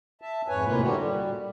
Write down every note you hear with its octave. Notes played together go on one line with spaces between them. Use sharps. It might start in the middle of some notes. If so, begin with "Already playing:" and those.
E5 A5
F2 G#2 B4 C#5 G#5
D#2 A2 C3 A#3 F4 B4
A#2 D3 G3 F#4 G4
G3